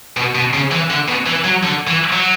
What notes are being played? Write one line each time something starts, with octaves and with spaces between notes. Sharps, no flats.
B2
B2
C#3
E3
D3
B2
E3
F#3
D3
E3
F#3